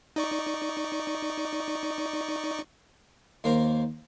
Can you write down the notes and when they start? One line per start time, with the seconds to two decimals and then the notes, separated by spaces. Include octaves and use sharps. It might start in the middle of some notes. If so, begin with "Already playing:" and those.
0.16 D#4 D5 C#6
3.44 D#2 A#3 A#4 C5 G5 A#5